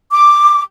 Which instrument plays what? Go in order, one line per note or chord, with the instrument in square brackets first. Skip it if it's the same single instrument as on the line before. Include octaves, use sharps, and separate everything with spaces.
[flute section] D6